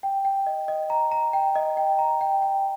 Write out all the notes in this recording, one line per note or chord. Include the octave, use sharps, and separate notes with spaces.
G5
G5
D#5
D#5
A#5
A#5
G5
D#5
G5
A#5
G5
G5